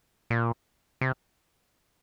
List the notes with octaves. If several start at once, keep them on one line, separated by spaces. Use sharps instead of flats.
A#2
C3